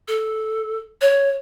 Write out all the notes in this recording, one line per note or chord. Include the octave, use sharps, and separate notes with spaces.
A4
C#5